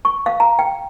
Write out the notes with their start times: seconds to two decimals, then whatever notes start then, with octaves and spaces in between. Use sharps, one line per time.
0.05 C#6
0.26 F5
0.40 A#5
0.59 G5